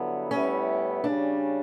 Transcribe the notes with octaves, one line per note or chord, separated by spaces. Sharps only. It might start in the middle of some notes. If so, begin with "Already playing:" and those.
Already playing: G2 D3 F#3 B3 E4
A2 G3 B3 C#4 E4
C#3 G3 C#4 D4